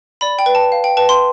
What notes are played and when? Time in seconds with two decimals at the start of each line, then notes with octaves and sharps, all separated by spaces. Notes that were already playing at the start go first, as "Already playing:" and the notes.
0.21 D5 B5
0.39 G5
0.46 B4
0.55 A5
0.72 F5
0.84 G5
0.97 B4 A5
1.09 C6